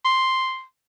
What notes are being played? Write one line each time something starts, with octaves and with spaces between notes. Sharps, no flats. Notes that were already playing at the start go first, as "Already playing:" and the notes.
C6